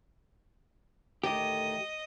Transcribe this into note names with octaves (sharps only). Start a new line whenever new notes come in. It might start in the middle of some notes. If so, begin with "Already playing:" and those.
D2 A2 D#3 G4 D#5